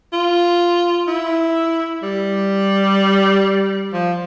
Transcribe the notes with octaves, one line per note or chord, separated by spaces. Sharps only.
F4
E4
G3
F3